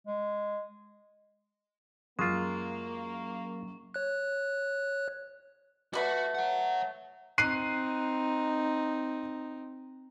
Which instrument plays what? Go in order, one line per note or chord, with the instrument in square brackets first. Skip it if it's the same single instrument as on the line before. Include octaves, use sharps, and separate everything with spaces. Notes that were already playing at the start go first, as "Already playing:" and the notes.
[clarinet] G#3
[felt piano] F#2 [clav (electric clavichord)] G#3 F4 [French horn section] A#3 [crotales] C#6
[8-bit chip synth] C#5 F#6
[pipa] A3 B4 D5 [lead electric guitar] F#4
[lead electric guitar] C#5 F#5
[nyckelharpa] C4 D#4 [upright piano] F#6 C7 D#7